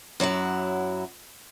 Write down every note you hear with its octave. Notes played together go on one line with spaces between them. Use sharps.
F#2 F#3 E4 F#5